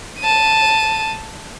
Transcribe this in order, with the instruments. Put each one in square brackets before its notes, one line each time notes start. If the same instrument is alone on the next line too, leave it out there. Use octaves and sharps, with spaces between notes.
[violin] A5 D#7